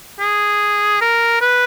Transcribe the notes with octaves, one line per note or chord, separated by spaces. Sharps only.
G#4
A#4
B4